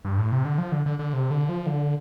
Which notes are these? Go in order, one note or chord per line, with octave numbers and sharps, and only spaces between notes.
G2
A2
C3
D3
F3
D3
D3
D3
C3
D3
F3
D3